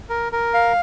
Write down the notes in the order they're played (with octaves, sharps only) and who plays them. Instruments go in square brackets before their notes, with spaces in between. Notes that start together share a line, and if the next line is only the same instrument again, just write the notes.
[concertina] A#4
A#4
F5